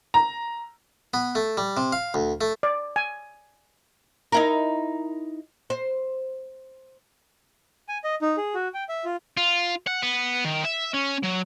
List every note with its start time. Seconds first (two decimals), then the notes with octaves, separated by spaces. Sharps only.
0.14 A#5
1.14 B3
1.35 A3
1.57 G3
1.77 C3
1.93 F5
2.14 D2
2.41 A3
2.63 D5
2.96 G#5
4.32 D#4 E4 A#4
5.70 C5
7.89 G#5
8.04 D#5
8.22 D#4
8.37 G#4
8.54 F#4
8.74 G5
8.89 E5
9.05 F4
9.37 F4
9.87 F#5
10.03 B3
10.45 D#3
10.65 E5
10.94 C#4
11.24 F#3